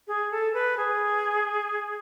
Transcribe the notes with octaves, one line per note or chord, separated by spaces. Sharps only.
G#4
A4
B4
G#4